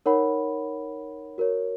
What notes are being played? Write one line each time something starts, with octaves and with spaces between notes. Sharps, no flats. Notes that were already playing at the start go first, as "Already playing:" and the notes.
D#4 A#4 C#5 F#5 B5
F#4 A#4 C#5